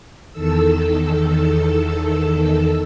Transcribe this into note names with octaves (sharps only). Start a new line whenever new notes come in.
E2 D#3 A4 E6